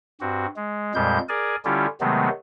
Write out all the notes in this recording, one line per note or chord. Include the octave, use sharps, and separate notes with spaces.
G2 C4 F#4
G#3
F2 A#2 G3 G#3 G6
G#4 A#4 D5 G#5
D3 G3 C#4 E4 F4 G4
C3 D#3 F#3 G#3 A3 B3